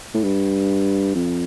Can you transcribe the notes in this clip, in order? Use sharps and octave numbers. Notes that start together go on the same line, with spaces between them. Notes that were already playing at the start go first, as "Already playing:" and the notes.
A2
G2
F2